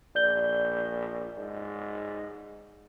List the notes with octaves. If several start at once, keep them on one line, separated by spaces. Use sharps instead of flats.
A#1 D5 G6 G7
G#2